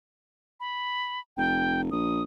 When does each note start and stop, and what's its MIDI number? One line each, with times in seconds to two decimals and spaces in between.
0.60 1.20 83
1.37 1.87 29
1.37 1.81 79
1.91 2.23 34
1.91 2.23 87